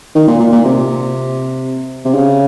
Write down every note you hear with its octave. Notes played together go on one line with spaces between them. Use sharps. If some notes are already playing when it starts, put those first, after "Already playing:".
D#3
A#2
A#2
A#2
C3
C3
C#3